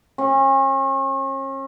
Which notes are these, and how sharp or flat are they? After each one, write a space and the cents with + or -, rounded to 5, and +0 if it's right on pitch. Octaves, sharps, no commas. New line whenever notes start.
C#4 -40